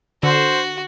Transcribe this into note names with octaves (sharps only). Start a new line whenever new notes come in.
D3 F#4 C5